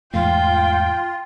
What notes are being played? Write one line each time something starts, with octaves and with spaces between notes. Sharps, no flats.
E2 G#2 A3 F4 F5 G5